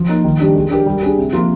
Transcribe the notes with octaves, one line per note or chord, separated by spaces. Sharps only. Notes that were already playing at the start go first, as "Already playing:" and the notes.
Already playing: F3
A#3 D#4
D#3
G3 D4 G4
G#3
D4 G4 A#4
G3
D4 G#4
C3
F3 A#3 F4